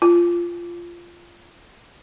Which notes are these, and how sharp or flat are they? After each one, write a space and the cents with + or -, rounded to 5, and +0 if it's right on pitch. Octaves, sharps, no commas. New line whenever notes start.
F4 -10